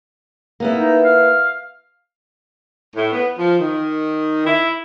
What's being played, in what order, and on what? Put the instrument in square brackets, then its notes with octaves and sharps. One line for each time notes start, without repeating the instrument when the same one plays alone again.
[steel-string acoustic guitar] A#3 B3 E4
[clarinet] D#4
F5
[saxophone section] A2
B3
F3
D#3
E4